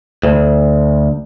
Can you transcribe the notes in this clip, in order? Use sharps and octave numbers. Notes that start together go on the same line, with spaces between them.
D2